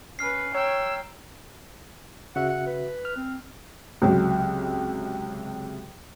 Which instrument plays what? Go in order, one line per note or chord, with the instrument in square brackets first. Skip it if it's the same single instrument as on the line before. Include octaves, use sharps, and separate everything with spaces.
[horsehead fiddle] C#4 B4 [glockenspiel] F6 C7
[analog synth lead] C#5 [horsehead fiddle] G5 [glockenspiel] A#5 [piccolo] E6
[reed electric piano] C#3 F#4 E5 [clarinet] F#5
[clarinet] F#5
B4
[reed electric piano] F6
[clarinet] C4
[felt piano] C#2 C3 F#3